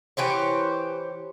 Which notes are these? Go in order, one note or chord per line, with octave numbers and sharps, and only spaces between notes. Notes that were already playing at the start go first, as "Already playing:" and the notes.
E3 G4 C5 C#5